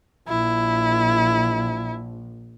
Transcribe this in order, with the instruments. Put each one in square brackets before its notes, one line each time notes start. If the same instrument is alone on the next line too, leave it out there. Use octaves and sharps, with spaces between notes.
[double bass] A#1 [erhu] E4